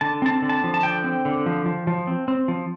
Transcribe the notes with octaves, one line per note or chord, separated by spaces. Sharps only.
D3 A5
C4 A5
D3
A5
F3
A5
D3 G5
C4
D3
F3
F3
F3
C4
C4
F3